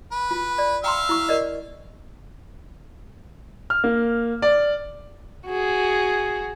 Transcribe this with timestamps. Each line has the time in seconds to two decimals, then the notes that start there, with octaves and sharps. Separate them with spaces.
0.12 B4
0.31 F4
0.58 D5
0.84 E5 F5 G5 A#5 C6
1.09 E4 C#6
1.29 A#4 D5 D#5
3.70 F6
3.84 A#3
4.42 D5
5.46 F#4 G#4